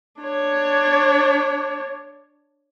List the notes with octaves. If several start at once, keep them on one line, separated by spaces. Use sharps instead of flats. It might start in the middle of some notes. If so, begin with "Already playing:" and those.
D4 C#5